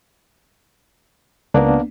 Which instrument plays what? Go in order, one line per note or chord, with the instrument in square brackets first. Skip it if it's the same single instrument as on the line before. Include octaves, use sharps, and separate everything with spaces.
[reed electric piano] C#2 A#4 [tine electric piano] A#3 B3 D4